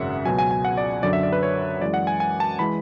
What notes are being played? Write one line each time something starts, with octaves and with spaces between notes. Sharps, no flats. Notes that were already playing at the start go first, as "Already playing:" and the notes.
Already playing: G#1 F#2 C#3 E5 F#5
C#2 B2 F#3 G#5
G#5
G#5
F#5
D5
F#2 D3 F#3 D5
E5
D5
B4
C#5
F#2 E3 G#3 D5
F#5
G#5
G#5
A5
E3 G#3 B5